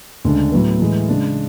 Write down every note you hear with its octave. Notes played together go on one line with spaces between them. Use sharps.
D2 C#3 G#3 D4
A2 F#3 B3
A2 E3 G#3
C#3 G#3 D4